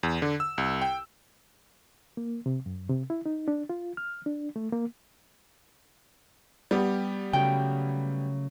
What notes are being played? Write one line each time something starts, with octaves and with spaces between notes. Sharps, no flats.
E2
D3
E6
C2
G5
A#3
C3
F#2
C3
E4
D#4
D4
F4
F6
D4
A3
A#3
G3 B3 G4
C#3 F#3 A3 G5